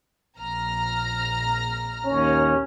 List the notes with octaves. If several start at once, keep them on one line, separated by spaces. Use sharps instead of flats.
A#1 A#5 F6
D#2 C#4